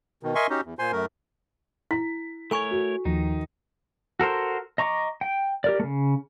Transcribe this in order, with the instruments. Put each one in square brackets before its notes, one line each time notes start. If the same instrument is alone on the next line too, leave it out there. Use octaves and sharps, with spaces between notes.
[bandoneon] B2 D#3
A#4 D#5 E5 G#5 C6 C#6
C#4 D#4 F#4 G4
E2
A#2 C5 G#5 C6
F#2 A3 A#4
[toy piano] E4 [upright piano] B6
[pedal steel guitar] A3 A#4 C#5 [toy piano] A4 G#5 C#6
[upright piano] F#4
[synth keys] D#2 F3 [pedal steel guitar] D#3 D#4
[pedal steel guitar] F#4 A4 A#4 C5
D#5 A#5 C#6 D6
G5
G4 A#4 D5
C#3 A3